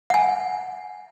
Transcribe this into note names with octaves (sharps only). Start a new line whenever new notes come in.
F#5 G#5